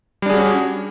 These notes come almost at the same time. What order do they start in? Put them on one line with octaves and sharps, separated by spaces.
G3 D4 G#4 F#4 C#4